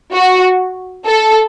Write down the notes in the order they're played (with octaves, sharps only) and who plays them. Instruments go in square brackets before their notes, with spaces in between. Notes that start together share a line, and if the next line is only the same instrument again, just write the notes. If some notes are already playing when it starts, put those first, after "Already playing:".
[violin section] F#4
A4